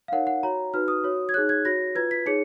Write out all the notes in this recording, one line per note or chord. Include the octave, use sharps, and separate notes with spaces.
F5
D#4 A#4 C#5 F#5
F#5
F#4 C#5 A#5
D#4 F#4 B4 F6
D#6
F#4 C#5
G#6
D#4 G#4 C#5 F#6
G#6
F#4 C#5 A#6
F4 B4 G#6
B6
D#4 G#4 C#5 C#7